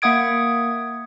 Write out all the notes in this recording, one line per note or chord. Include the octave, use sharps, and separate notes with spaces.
A#3 E5 F#5 D#6 G#6 D7